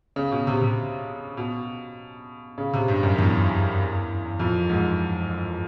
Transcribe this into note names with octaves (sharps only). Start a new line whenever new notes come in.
C#3
B2
C3
C3
B2
C#3
C3
G2
F#2
E2
F2
G#2